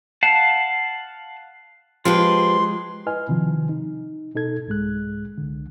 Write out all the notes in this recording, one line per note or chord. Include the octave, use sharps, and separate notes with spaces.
F5 F#5 A5
F3 G#3 G4 B4 C6
E4 B4 D#5 G#5 F6
C3 D#3 F3
D#4
B2 D#4 A4 G#6
C2 G#2 G#3 F#6
C2 D3